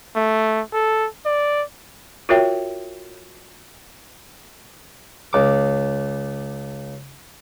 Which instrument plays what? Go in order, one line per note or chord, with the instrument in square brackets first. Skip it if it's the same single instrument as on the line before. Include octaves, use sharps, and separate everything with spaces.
[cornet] A3
A4
D5
[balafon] F4 F#4 A#4 C#5 E5 G5
[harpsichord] C#2 D6